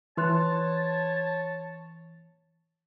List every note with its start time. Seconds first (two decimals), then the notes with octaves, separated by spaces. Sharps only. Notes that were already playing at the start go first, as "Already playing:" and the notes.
0.17 E3 B4 C#5 A5 C6 F#6